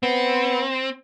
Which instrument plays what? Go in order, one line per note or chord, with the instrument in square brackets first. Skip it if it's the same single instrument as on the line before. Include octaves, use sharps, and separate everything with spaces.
[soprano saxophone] B3 [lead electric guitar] C4